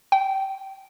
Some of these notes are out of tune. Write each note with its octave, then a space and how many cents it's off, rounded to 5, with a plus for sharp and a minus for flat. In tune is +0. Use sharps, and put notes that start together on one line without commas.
G5 -20